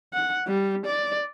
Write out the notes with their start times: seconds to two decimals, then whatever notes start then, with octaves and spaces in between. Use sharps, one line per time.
0.13 F#5
0.47 G3
0.86 D5